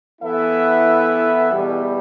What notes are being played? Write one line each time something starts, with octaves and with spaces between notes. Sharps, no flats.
E3 B3 E4 A4 E5
E2 B2 G3